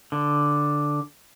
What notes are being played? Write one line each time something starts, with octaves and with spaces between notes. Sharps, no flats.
D3